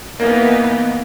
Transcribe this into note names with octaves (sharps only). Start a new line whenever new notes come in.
E3 A#3 B3 D#4